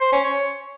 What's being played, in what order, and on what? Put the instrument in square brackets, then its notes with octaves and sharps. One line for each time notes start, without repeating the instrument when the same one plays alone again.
[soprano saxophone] C5
C#4
C#5